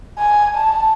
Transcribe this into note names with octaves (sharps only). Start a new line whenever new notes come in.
G#5
A5